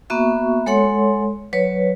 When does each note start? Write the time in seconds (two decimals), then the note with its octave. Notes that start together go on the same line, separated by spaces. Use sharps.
0.10 A#3 B3 F#4 E5 C#6
0.66 G#3 A4 C#5 F#5 C6
1.53 F#3 B4 C#5